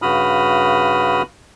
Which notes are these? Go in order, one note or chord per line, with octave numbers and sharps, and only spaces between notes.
G2 C#3 F#4 B5 D#6 F6